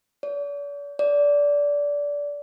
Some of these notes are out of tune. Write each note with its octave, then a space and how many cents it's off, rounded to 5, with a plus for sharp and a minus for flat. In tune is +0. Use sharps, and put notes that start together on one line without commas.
D5 -45
D5 -20